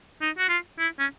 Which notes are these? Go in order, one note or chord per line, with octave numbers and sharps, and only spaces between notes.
D#4
F#4
F4
E4
C#4